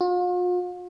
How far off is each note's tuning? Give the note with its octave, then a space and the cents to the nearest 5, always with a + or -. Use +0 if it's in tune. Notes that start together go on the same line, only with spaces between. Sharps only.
F4 +45